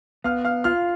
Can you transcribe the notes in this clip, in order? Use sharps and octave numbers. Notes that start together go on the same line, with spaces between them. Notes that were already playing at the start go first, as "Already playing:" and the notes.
B3 F5 F6
F5 F6
F4 F5 F6